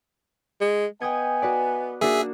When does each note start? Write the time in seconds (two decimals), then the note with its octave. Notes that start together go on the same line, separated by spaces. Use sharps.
0.61 G#3
1.02 B3 D#5 G5 G#5 D#6 G#6
1.42 F#4 B4 D5
2.01 A#3 D4 F#4 G#4 E5